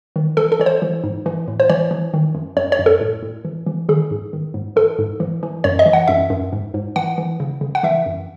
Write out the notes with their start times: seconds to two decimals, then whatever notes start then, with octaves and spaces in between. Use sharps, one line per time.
0.16 D#3
0.37 E3 A4
0.52 A4
0.60 E3 C#5
0.66 C5
0.82 E3
1.04 G#2
1.26 E3
1.48 A2
1.60 C5
1.69 E3 C#5
1.91 E3
2.14 D#3
2.34 F#2
2.57 F#2 C#5
2.72 C#5
2.79 F#2
2.86 A4
3.01 A2
3.23 A2
3.45 E3
3.66 E3
3.89 D#3 G#4
4.11 G#2
4.33 D#3
4.54 G#2
4.76 E3 A4
4.99 G#2
5.20 E3
5.43 E3
5.64 F#2 C#5
5.79 D#5
5.86 E3
5.93 F#5
6.08 F#2 E5
6.30 F#2
6.53 G#2
6.74 G#2
6.96 E3 F#5
7.18 E3
7.40 C#3
7.61 C#3
7.75 F#5
7.83 E3 E5
8.06 F#2